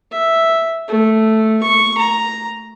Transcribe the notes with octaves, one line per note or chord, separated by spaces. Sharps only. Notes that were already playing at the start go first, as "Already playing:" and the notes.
E5
A3
C#6
A#5